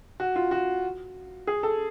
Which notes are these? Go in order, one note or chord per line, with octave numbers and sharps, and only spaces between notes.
F#4
F4
F#4
G#4
A4